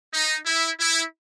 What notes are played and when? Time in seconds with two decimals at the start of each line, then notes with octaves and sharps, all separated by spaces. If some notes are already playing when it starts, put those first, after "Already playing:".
0.13 D#4
0.46 E4
0.80 E4